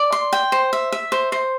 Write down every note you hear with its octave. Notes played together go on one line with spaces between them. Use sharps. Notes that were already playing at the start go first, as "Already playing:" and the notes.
Already playing: D5
C6
G5
C5
E5
E5
C5
C5